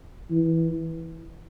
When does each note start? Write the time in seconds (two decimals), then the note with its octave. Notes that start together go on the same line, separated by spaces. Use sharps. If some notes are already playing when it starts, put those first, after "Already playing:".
0.31 E3